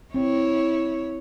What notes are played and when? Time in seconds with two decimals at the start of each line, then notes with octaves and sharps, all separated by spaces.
0.14 C4 E4 C#5